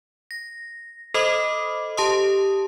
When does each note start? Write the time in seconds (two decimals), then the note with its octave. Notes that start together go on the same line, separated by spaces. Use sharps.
0.31 A#6
1.14 A4 C5 D#5 B5 D6 D#6
1.97 G4 A5 C6 D#6